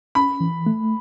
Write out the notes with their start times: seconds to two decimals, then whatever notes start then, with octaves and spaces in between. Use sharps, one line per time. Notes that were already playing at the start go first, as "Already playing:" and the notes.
0.15 C#4 B5
0.41 E3
0.66 A3